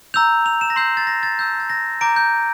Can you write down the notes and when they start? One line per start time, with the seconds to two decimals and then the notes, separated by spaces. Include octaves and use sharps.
0.14 A#5 E6 G6 F7
0.46 F7
0.61 E7
0.70 A#6
0.76 C6 E6 G6 C7
0.97 A6
1.07 A#6
1.23 A6
1.39 A5 E6 G6
1.60 A6
1.70 A#6
2.01 A#5 D6 G6 D7
2.16 G6